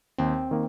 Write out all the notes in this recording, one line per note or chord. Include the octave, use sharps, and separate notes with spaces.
D#2 C4
D#3 A#3